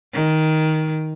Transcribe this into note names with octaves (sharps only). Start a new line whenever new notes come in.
D#3